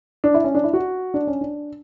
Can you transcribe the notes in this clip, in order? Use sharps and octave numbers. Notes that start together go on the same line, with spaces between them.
D4
E4
C#4
D4
E4
F#4
D4
C#4
D4